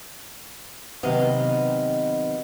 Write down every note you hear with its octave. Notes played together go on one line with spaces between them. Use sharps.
C3 D#3 F#3 B3 D#5 F5